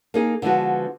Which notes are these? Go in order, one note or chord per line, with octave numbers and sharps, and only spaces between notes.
A#3 D#4 G#4
D3 F3 G#3 B3 F#4